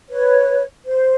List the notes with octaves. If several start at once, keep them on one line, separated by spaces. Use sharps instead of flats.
B4 C#5
C5